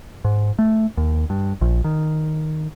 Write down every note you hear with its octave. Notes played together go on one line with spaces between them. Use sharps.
G#2
A3
D#2
G2
A#1
D#3